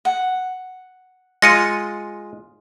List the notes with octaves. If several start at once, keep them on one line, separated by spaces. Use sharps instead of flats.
F#5
G#3 F4 A#6 C#7 D#7